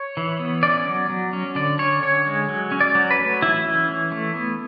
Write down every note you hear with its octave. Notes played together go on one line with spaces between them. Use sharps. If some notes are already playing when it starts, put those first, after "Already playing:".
Already playing: C#5
E3
B3
C#4 D5
F#3
F#3
C#4
D3 D5
C#4 C#5
D3 C#5
G#3
F#3
C#4
D5
F#3
B4
A3
E3 E4
C#4
E3
A3
B3